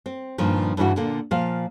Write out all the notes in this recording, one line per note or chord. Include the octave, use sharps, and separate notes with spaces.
C4
G2 A#2 D#3 F3
G2 C#3 E3 E4 F#4
A#2 D3 A#3
A#2 F3 F5